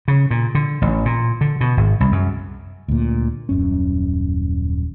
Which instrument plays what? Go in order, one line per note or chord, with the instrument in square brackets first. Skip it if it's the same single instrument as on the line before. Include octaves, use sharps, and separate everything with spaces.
[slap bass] C#3
A#2
D3
A1
A#2
D3
B2
G#1
C2
F#2
[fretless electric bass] D2 A#2
D#1 F#2 C#4